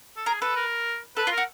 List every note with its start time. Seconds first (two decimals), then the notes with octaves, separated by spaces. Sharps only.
0.17 A4
0.26 G#4 A#4
0.41 A4 B4
0.56 A#4
1.17 A4 B4
1.27 F4
1.32 A#4
1.37 F#4